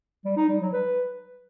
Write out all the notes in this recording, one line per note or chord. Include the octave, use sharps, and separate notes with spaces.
G3
D#4
G3
F#3
B4